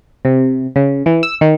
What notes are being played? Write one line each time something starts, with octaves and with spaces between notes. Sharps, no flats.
C3
C#3
E3
E6
D#3